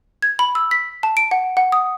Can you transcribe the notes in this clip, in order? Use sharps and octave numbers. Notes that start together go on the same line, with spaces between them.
G#6
B5
E6
B6
A5
D7
F#5
F#5
D#6